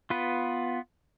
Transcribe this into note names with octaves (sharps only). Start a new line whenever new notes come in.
B3 F4 B4